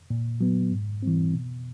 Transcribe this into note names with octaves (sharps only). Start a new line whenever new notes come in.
A#2
F#3 B3
G#2
E3 G3 C4
B2